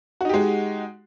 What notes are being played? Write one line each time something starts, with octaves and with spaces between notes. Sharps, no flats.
G#3 D#4 F#4 G4